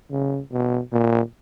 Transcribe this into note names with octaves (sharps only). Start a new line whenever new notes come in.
C#3
B2
A#2